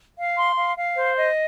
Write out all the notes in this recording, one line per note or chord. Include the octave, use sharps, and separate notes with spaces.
F5
C6
F5
F5
C5
D#5